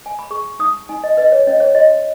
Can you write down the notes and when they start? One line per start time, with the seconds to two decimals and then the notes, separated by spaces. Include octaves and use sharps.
0.06 G#5
0.19 B5
0.31 G#4 C#6
0.59 D#4 D#6
0.89 D#4 G#5
1.04 D#5
1.17 B4 D#5
1.32 C#5
1.47 C#4 D#5
1.60 C#5
1.75 F#4 D#5